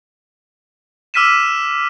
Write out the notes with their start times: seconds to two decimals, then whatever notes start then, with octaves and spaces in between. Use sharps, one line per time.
1.14 D6 E6 F6 B6 D#7 E7